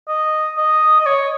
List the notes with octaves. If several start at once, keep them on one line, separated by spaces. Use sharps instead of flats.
D#5
D#5
D#5
C#5